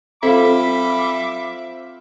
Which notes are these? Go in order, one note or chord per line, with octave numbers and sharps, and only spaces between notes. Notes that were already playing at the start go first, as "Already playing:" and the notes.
C4 F4 A4 E5 B5 D6